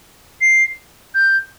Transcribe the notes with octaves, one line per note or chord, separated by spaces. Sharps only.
C7
G6